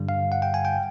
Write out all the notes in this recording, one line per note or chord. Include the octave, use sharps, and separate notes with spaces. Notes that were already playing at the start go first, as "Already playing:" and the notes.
Already playing: G2 D3 G3
F5
F#5
G5
G#5
G5